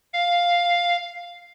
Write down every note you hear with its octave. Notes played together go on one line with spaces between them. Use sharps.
F5